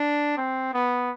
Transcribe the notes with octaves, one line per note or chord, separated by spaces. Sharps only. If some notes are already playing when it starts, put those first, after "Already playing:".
Already playing: D4
C4
B3